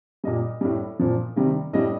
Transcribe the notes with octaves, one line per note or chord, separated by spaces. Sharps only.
A#2 G3 D#5
A2 G3
A#2 F3
C3 D#3 G3
A2 G3 D#5